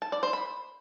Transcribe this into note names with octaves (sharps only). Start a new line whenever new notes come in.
A5
D5
C5
B5